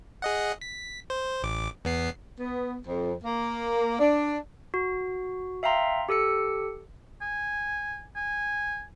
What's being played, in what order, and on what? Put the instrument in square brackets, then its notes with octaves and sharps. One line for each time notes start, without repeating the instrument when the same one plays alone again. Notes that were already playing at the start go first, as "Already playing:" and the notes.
[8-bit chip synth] G#4 D#5 F#5
B6
C5
A1 D6
E2 B3 C7
[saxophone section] B3
F2
A#3
D4
[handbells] F#4
E5 F5 G5 A#5 C6
G4 A4 E6 C#7
[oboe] G#5
G#5